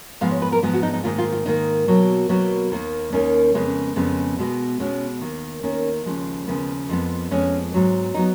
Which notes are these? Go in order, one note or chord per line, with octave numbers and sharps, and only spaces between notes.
G#2 F3 G#3 B3 F5
C#5
B4
A#4
G#2 F3 G#3 B3 G#4
F#4
D#4
D#4
G#2 D#3 A#3 F4
F4
F4
G#2 D#3 A#3 D#4
B2 F#3 A#3
B2 F#3 A#3 B3
D#2 D#3 A#3
D#2 D#3 A#3 C#4
F2 C#3 G#3 B3
F2 C#3 G#3 B3
B2 G#3 B3
B2 G#3 B3 C#4
D#2 D#3 A#3
D#2 D#3 A#3 C#4
D#2 C#3 F3 G#3
D#2 C#3 F3 G#3 B3
F2 F3 G#3 B3
F2 F3 G#3 B3 C#4
G#2 F#3 B3
F#3 B3 D#4